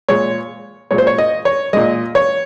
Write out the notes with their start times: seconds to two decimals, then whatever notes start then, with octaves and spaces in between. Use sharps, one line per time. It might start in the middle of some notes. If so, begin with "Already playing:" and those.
0.08 A#2 G#3 C#5
0.91 A#2 G#3 C#5
0.98 C5
1.07 C#5
1.18 D#5
1.45 C#5
1.73 A#2 G#3 D#5
2.15 C#5